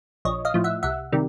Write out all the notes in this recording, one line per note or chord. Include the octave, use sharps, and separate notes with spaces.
A#1 C#5 D#5
D#5 F5
A2 F3
E5 F#5
C2 E5 F#5
C3 D#3 G3